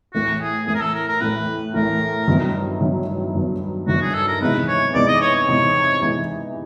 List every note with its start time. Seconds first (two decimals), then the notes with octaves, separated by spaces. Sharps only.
0.14 A2 E3 A3 F#4
0.41 G#4
0.67 A2 E3 A3 G#4
0.75 A#4
0.81 A4
0.94 A#4
1.08 A#4
1.21 A2 E3 A3 B4
1.74 A2 E3 A3 A#4
2.28 G2 D#3 F#3 B3 E4
2.81 G2 D#3 F#3 B3 E4
3.35 G2 D#3 F#3 B3 E4
3.87 G2 D#3 F#3 B3 E4 F#4
4.01 G#4
4.14 A4
4.28 A#4
4.41 C3 E3 G#3 B3 D#4 B4
4.68 C#5
4.94 C3 E3 G#3 B3 D#4 D5
5.08 D#5
5.21 C#5
5.35 C#5
5.48 C3 E3 G#3 B3 D#4
6.02 C3 E3 G#3 B3 D#4